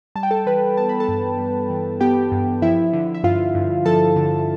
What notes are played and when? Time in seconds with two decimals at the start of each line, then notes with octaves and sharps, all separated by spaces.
0.15 G3 A5
0.23 G5
0.31 A4 A5
0.46 E3 B4 B5
0.77 B3 A5
0.89 B5
1.00 A4 A5
1.08 G2
1.39 G3
1.70 E3
2.00 B3 G4 G5
2.32 G2
2.62 F3 E4 E5
2.93 D3
3.14 E5
3.24 G2 F4 F5
3.55 G2
3.86 F3 A4 A5
4.16 D3